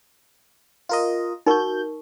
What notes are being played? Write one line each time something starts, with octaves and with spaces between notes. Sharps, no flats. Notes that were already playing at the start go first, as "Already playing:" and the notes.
F4 A#4 D#5
D#4 F#4 A#4 C#6 G6